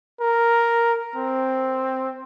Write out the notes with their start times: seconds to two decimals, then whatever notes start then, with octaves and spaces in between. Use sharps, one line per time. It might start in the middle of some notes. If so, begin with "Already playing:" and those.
0.21 A#4
1.16 C4